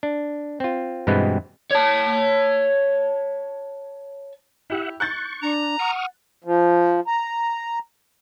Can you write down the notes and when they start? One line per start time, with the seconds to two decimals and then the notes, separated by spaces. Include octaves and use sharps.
0.03 D4
0.60 C4 F4
1.07 G2 B2 E3 G#3 B3 C4
1.71 C#5 A5
4.70 E4 G4 E5 F#5
5.00 C#6 F#6 G6 A6
5.42 D4 A#5
5.79 F#5 C#6 D#6 F6
6.44 F3
7.07 A#5